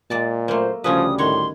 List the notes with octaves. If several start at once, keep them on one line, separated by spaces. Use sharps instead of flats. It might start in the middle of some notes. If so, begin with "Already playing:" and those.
A#2 G#3 D5 A5
F#2 A3 A#3 C5
D2 C#3 F3 G3 C#4 B4 D#6
A2 D#3 C#5 F#5 C6